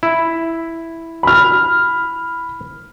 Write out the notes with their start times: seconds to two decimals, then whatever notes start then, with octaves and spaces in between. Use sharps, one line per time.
0.03 E4
1.23 B5 F6